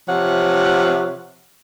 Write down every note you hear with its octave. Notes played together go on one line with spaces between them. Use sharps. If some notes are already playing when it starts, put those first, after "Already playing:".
C3 F3 C#5 F#5